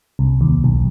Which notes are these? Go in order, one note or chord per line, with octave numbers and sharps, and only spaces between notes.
C2
D#2
B1